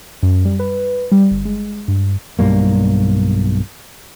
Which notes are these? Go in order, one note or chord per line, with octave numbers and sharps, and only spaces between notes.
F#2
G3
B4
G3
G1
G#3
G2
B1 G2 G3 A#3